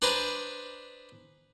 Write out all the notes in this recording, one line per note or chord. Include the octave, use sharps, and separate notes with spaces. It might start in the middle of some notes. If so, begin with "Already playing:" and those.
D4 G#4 B4 C5 A#5